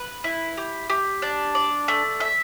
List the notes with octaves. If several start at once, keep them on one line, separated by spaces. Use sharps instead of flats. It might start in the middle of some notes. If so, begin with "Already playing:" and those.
Already playing: B4
E4
G4
G4
D4
D5
A3
E5